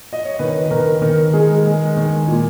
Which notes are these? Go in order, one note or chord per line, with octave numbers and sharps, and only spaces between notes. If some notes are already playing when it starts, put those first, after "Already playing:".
D#5
C#5
D#3 B4
B4
D#3 A#4
D#3 A#4
G#3 G#4
G#3
D#3
A#2